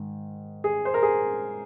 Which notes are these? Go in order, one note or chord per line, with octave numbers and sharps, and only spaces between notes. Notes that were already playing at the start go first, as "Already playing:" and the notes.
Already playing: G#2 D#3
G#4
C5
A#4
G#4